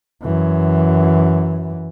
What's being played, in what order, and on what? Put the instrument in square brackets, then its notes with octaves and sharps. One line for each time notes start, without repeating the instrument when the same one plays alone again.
[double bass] F#2 E3